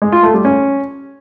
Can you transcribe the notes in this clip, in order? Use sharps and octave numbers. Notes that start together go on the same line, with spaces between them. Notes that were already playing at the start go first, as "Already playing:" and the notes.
G#3
F4
A3
G3
C#4